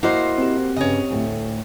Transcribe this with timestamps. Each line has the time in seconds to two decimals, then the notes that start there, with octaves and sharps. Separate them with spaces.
0.03 A#3 E4 F#4 C5 D#5
0.38 C4 G4
0.76 G2 C#3 C#5 D#5
1.10 D2 A2